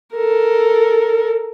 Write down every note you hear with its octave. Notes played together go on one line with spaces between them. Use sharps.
A4 A#4